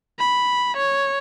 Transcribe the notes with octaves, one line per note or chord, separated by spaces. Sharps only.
B5
C#5